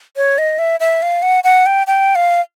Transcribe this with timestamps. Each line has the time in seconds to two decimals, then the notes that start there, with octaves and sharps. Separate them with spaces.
0.16 C#5
0.38 D#5
0.59 E5
0.80 E5
1.02 F5
1.22 F#5
1.44 F#5
1.66 G5
1.87 G5
2.15 F5